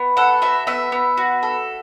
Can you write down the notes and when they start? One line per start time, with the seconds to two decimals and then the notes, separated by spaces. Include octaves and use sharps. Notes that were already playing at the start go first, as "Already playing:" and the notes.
Already playing: B3
0.17 A4 F#5
0.42 F#4 E5
0.67 B3 E5
0.92 B3
1.17 F#4
1.43 A4